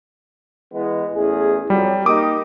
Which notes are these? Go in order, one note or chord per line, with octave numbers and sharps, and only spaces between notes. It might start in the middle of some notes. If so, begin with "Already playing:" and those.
E3 G#3 B3
A1 E2 G#4
F2 F#3 G3
A#3 D#4 G4 D6 D#6